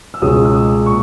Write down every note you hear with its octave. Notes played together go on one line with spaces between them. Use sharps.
E6
C#2 B2 G#3 C#4 D#6
E6
D#6
A#2 C#6